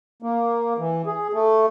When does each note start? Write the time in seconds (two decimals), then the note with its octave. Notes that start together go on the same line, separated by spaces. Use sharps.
0.22 A#3
0.78 E3
1.06 G#4
1.33 A3